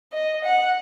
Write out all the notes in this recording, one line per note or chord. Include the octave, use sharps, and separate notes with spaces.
D#5
F#5